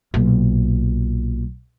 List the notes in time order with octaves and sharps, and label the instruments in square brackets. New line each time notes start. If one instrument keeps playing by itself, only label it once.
[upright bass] B1 A#2